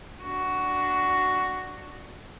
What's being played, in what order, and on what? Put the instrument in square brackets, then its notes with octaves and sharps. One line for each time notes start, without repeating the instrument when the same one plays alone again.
[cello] D4 F#4